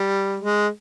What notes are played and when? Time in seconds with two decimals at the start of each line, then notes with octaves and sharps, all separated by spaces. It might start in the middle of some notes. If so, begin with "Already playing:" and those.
Already playing: G3
0.40 G#3